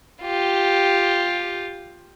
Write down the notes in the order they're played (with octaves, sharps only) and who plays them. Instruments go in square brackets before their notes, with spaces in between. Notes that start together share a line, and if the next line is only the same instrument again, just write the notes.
[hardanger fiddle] F4 G4